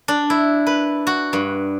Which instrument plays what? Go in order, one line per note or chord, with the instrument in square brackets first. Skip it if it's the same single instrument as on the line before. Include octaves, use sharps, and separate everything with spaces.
[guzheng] D4
E4
B4
F#4
G2